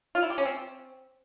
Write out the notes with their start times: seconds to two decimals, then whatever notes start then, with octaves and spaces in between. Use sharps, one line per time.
0.15 F4
0.23 E4
0.30 G4
0.38 C#4
0.45 C4